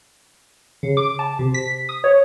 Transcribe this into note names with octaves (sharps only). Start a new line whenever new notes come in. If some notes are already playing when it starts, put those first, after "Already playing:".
C#3
D6
A5
C3
B6
D#6
C#5